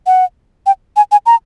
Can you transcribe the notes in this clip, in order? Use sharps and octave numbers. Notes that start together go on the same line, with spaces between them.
F#5
G5
G#5
G#5
A#5